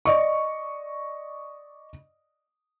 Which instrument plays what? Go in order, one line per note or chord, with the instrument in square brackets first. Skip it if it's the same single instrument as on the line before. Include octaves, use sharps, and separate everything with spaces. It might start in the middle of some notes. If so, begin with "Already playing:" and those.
[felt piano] D5 D#5 C#6